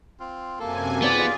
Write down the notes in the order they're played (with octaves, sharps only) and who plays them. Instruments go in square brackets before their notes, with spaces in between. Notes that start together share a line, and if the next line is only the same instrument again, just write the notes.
[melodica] C4 F4
[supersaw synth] F#2 C3 G#5 [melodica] A#3 A4
[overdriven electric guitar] B3 [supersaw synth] F4 G#4 [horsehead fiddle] D5